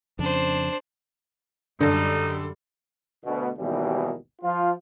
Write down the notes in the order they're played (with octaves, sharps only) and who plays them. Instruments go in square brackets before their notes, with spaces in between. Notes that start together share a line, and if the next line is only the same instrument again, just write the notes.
[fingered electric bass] F2 C#3 [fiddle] D4 C5
[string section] F#2 G3 [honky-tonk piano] D3 A4 [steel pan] D4 [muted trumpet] D#4
[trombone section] D2 B2
G#1 D#2 B2 D#3 E3 G3
F3 F4